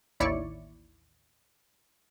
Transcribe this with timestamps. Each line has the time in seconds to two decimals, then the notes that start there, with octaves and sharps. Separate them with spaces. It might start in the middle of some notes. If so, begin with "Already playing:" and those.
0.20 A1 D#2 E4 C#5 D5 C#6